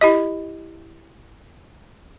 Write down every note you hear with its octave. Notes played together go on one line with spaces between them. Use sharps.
E4 G4 D#5